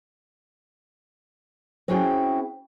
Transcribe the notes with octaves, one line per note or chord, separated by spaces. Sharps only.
C4 C#4 E4 F#4 G#4 G5